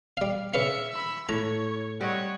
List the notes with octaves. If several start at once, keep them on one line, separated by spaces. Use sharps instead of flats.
G3 F5
C#3 B4 E5 F5 C#7
B5 E6
A2 C#5 A#5
G3 C4 C#5 D#5 F#5